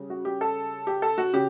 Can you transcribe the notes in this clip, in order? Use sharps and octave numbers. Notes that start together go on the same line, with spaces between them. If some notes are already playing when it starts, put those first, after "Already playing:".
Already playing: C#3 G3
F#4
G4
A4
G4
A4
F#4
C#3 G4